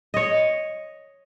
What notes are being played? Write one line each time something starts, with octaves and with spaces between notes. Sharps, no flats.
C#5 D#5